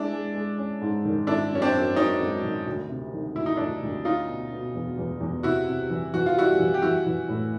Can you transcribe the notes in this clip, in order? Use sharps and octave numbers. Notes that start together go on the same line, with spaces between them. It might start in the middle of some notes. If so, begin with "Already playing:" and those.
Already playing: G#3 D4 E4
G#3
G#3
C#4
G#2
D#3
G#1 D4 E4
F#2 C#4
C4 D4
F#2
F#2 C#4 D#4
G#1
D#3
D2
C3
D#3
D2 E4
D#4
D2 D4 E4
D2
C#4 D#4 F4
B2
B2
E2
E2
E2
C3 E4 F#4
C3
E3
E3 F#4
F4
G3 E4 F#4
E3
G4
E3 E4 F#4
E3
A2